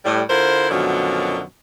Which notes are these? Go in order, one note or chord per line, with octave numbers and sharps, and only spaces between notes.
A2 G3
D3 E4 F4 A#4 C5
F#2 B2 D3 D#3 F3 F#3